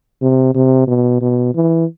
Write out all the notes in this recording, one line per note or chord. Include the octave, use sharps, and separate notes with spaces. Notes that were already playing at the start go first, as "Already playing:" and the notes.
C3
C3
B2
B2
E3